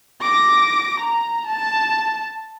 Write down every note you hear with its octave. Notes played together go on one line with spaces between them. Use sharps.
D6 A#6
A#5
A5